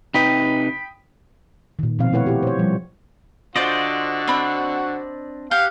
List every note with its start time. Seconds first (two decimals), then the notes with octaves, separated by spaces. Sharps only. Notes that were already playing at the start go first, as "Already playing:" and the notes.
0.14 C3 D#4 B4 G5 B5 D#6 B6
1.79 A#2 D#3
1.99 B2 F3 C4 F5
2.13 A3 E4 B4 C#5 F#5
2.26 E4 F#4 G4
2.43 C5 C#5
2.59 F3 G3
3.56 D3 F4 F#4 C5 D5 D#5
4.28 C4 D4 B5
5.51 G4 F5 F#5